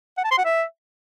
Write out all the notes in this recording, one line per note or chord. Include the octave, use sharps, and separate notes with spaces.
F#5
A5
C6
F#5
E5